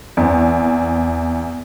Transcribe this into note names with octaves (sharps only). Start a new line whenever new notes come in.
E2 C4